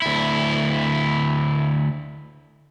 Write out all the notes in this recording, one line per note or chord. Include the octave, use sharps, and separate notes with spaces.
D2 E4